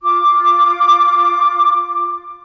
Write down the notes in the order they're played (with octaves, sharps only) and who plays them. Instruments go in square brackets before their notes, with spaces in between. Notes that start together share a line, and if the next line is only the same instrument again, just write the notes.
[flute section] F4 D6